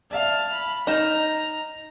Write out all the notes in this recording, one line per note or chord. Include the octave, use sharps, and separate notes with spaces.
D5 E5 F5 A5 F6
B5
D#4 A#5 F6 G6 E7